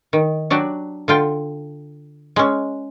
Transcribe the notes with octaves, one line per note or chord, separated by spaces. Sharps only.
D#3
F#3 D4 F#4 G4
D3 F4 G5
G#3 C#4